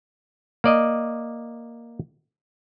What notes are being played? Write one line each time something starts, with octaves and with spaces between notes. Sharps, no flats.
A#3 D5 D#5